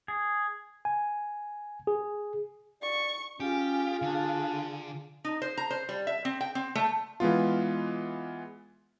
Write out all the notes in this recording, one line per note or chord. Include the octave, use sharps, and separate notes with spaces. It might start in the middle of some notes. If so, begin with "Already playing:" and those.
G#4
G#5
G#4
D5 C#6
C#4 F4 G4 G#4
D3 D4
D#4
C5
A#5
C5
G3
E5
C4
G5
C4
A3
E3 G#3 B3 F4